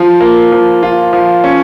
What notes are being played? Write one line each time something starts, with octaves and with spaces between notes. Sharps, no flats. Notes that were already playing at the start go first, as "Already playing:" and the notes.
Already playing: F3 F4
A#3
F3
F4
F3
C#4